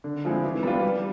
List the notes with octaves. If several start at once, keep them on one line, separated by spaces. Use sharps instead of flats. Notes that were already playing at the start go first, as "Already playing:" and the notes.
D3
F3 G#3 C4 E4
E3
G3 B3 D4 F4
G3